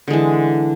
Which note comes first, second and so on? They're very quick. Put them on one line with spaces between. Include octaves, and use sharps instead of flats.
D3 G#3 E3